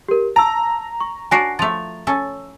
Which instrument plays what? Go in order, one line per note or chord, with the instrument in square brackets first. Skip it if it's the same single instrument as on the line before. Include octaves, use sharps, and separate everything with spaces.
[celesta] G4 A#4
[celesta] A5 E6 [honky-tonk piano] A#5
[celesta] C#6
[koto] D4 F#4 A#4 [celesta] G#5 A#6 C7
[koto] F3 A3 [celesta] A6 F7
[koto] C#4 A4